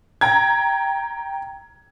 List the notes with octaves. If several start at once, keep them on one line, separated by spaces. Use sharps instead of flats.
G5 A#5 G#6